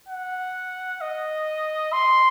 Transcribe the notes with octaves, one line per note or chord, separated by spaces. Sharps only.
F#5
D#5
C6